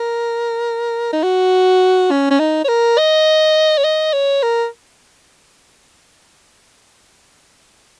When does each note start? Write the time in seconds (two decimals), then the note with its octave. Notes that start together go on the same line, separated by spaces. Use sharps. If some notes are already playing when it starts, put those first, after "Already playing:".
Already playing: A#4
1.13 D#4
1.23 F#4
2.11 C#4
2.31 C#4
2.39 D#4
2.65 C#5
2.68 A#4
2.98 D#5
3.78 C#5
3.84 D#5
4.13 C#5
4.43 A#4